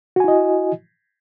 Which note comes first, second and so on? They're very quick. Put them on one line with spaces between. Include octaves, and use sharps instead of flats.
F#4 G#5 E4 D#5